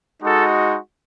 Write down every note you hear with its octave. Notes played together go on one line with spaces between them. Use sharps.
G#3 D#4 F#4 A4